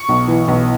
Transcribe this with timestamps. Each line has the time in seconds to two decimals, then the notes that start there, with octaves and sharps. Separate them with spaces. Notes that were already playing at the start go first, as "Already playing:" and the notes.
Already playing: C#6
0.09 B1
0.28 E3
0.48 B1